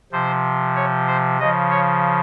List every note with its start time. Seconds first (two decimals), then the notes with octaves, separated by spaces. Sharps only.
0.12 C3 F3 C5
0.76 C#5
1.07 C5
1.40 C#3 F3 D#5
1.71 C#5